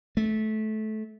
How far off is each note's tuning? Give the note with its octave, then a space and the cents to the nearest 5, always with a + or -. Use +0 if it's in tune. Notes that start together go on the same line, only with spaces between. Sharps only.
A3 -20